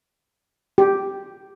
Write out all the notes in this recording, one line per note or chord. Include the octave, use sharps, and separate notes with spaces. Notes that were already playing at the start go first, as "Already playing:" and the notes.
G4